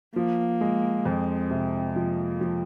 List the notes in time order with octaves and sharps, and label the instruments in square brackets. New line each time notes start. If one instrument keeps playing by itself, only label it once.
[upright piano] F3 [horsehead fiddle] A#3
[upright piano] G#3
[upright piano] F2 [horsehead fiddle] C4
[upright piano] C3
[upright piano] F3 [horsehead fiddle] A#3
[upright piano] F3